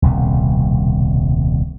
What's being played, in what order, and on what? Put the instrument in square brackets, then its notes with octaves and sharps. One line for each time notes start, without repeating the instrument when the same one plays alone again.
[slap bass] D#1 C2 B2